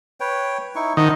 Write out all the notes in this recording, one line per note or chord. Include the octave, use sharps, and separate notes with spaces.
B4 C#5 G5
D#4 E4 C#6
D#3 C5 F#5 A5